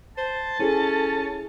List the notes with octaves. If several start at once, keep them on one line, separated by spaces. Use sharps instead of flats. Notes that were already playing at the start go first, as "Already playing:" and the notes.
C5 A5
C#4 E4 G#4 A4